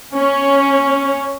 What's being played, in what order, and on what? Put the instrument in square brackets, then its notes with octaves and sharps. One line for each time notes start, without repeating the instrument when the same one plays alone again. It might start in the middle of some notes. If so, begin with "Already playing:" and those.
[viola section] C#4